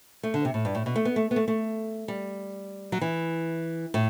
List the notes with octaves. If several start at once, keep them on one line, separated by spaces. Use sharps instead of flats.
A3
D3
C3
A2
G2
A2
B2
A3
B3
A3
B3
A3
A3
G3
F#3
E3
A2